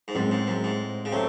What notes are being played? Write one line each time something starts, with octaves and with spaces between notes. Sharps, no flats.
G#2
F#2 A2 G#3 C4
G#2
F#2
G#2
C#3
C3 F#3 A3